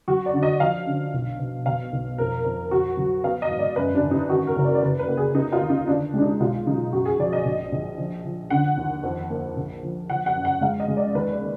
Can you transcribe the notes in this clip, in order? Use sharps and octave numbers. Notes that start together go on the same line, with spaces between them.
F#3 F#4
D5
D3
D#5
F3 F5
D3
B1
B2
B2 F5
B1
F2 A#4
F2
F2 F#4
F#3
B3 F5
D#5
G#1
D5
F#2 B4
D4
G#1
D#4
D#3 F#4
A#4
F#1
D5
D5
F#1 B4
B4
A#3
G#4
B3 D#4
F4
D#2
D#4
D3 D4
G#3 D4
D#4
B1 F4
F#3 D#4
F#2 F#4
G#4
F3 D5
D#5
A#1
A#1
F3
F3
D3 F#5
D#2
F2
A#3
A#1
F3
F3 F#5
F#5
F#2
F#5
G#3 F5
D#5
G#3
D5
D#2 B4
D5
A#3